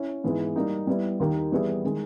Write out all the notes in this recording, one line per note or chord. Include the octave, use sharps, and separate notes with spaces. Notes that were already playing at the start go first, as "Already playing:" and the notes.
Already playing: C#4 E4
G#2 E3 G#3 B3
G3 A#3 D#4
G3 B3 E4
D#2 D#3 A#3 D#4 G4
E3 G3 B3 E4 G#4
D#3 G#3